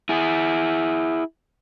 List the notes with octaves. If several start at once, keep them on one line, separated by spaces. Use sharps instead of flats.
E4 G#4